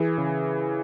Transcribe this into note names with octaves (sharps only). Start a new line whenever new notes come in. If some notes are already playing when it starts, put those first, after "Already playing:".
Already playing: E3 G#4
C#3